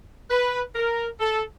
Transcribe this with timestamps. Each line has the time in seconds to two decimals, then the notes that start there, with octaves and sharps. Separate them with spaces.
0.30 B4
0.75 A#4
1.20 A4